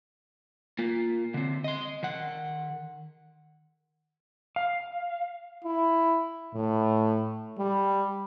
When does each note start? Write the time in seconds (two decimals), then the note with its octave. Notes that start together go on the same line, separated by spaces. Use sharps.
0.79 A#3 F4
1.34 D3 C4
1.64 D#5 C6
2.03 D#3 F#5
4.56 F5
5.64 E4
6.54 A2
7.58 G3